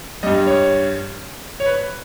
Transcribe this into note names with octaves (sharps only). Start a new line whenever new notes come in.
G2 G3 D#5
C#5
C#5
B4